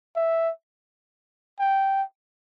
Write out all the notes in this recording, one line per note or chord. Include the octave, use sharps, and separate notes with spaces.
E5
G5